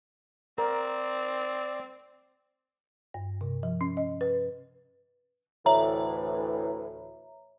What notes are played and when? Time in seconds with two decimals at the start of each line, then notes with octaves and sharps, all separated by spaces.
0.58 C4 A#4 D5
3.14 G2
3.41 C3
3.63 F3
3.81 C#4
3.97 D#5
4.21 B4
5.66 D2 A2 E3 C#5 E5 A#5